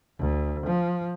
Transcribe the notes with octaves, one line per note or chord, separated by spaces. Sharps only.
D2
F3